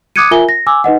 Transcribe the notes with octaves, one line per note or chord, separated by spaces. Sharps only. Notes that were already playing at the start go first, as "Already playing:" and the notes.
D6 D#6 F#6 G#6 C#7 D#7
F4 A#4 E5 G#5 G7
A#6
G#5 D6 E6
D#4 B4 D#5 F#5